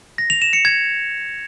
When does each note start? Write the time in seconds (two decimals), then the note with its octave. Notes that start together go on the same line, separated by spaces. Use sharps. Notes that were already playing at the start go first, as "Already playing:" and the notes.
0.18 A#6
0.30 F7
0.42 E7
0.53 C#7
0.65 G#6